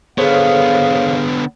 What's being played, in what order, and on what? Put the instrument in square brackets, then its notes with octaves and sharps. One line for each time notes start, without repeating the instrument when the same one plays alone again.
[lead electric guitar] D3 B3 [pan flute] G#4 [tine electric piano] A4 C5 C#5 [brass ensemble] F5